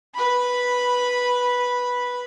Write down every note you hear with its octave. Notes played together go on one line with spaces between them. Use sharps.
B4 B5